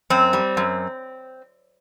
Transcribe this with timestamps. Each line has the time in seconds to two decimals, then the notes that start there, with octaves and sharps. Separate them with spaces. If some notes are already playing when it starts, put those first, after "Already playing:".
0.10 F#2 C4
0.33 G3
0.57 F#2